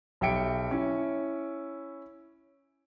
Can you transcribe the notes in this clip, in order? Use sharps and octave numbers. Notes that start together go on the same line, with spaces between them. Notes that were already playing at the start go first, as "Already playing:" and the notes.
B1 G4 E5 G5 C#7 D7
C#4 E4